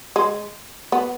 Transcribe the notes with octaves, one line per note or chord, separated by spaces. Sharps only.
G#3
B3